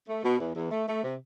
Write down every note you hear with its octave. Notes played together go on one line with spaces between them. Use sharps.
A3
B2
E2
E2
A3
A3
C3